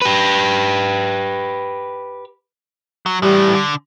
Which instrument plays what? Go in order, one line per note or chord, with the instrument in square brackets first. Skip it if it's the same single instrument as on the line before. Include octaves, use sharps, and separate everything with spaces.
[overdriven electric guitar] G4 B4
[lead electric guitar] F#3
[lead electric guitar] A2 E3 [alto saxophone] G3
[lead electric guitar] D3